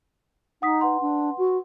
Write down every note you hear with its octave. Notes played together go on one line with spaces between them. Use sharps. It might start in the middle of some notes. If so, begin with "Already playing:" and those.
D#4 F#5 D#6 B6
B4 F#5 C6
D4
F#4